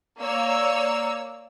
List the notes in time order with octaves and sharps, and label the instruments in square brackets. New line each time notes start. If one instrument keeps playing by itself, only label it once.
[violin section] A#3 C#5 D5 E6